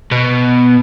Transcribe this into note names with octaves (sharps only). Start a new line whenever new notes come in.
B2